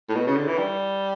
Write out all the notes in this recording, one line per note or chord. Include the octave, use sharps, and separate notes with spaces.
A2
B2
C#3
D3
E3
G3